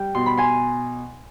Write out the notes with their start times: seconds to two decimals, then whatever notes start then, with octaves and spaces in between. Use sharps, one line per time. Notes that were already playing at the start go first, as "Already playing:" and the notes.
Already playing: G3 G5
0.15 B2 C6
0.26 B5
0.37 G#5 C6